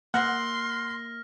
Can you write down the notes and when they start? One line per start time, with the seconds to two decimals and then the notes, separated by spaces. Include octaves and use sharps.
0.14 A#3 F#5 C6 F6 A#6